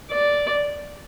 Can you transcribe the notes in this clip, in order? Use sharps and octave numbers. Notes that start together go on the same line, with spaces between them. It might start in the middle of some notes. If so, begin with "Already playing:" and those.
D5